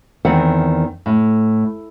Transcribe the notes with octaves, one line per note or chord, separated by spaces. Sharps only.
E2 D#3 C4 F#5
A2